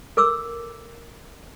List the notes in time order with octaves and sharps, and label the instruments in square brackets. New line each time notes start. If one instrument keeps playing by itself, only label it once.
[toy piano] A4 A#4 D6 E6